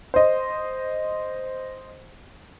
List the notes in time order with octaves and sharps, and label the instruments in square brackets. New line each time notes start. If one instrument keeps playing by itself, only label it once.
[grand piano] C5 D#5